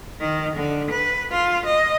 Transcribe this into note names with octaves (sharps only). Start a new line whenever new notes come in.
D#3
D3
B4
F4
D#5